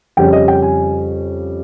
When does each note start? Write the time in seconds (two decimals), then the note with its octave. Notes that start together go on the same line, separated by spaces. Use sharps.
0.17 F2 C#3 G3 C#4 G5
0.33 D#5
0.48 G5
0.62 G#5